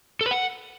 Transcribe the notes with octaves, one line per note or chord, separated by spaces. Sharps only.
A4
B4
F#5